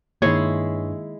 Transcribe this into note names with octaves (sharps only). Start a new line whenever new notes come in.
G2 D#3 G#3 A#3 E4 C#5 C6